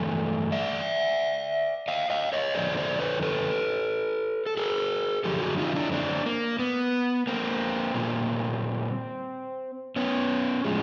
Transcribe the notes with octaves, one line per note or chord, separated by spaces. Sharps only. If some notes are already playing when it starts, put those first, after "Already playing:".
Already playing: G2 E3 A3
D5 E5
D#5 F5
D#5 F5
C#5 D#5
F2 D3 F3 C5 D5
C5 D5
B4 C#5
A4 B4
A4
G#4 A#4
F#2 D3 F3 G4 A4
F#4 G#4
D#4 F4
D4 E4
C4 D4
A#3
B3
A#3 C4
A#2 G3 A#3
B3 C#4
A2 F3 G#3